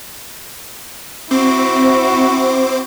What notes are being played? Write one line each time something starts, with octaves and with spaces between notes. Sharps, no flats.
C4 E4 F#4 C5 D6